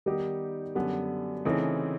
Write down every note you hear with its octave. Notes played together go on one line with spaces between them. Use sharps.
D#3 G3 B3 D#4 G4
F#2 D3 G3 B3
C#3 E3 A3 C4 D#4